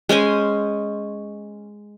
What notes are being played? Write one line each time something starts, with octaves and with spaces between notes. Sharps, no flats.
G#3 C#4 C5 G#5